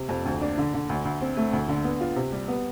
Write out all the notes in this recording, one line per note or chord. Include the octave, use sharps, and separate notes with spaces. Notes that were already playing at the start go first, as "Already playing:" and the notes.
Already playing: C3
F2
D2
D4
D3
D3
D2
D2
C4
A3
D2
D3
B3
F4
C3
G3
B3